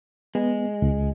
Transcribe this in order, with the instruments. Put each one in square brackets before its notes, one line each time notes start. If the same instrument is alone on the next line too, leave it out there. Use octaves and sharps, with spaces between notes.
[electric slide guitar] G#3 [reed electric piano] B3
[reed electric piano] C#2